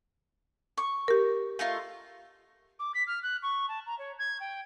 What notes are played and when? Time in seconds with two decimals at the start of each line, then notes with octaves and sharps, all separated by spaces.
0.77 C#6
1.08 G4 A#4
1.59 A3 D#4 F4
2.79 D6
2.94 B6
3.07 F6
3.23 F#6
3.42 C#6
3.68 A5
3.86 A#5
3.98 C#5
4.19 G#6
4.40 G5